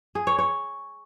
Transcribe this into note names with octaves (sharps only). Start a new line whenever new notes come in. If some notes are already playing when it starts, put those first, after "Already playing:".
G#4
C#5
C#5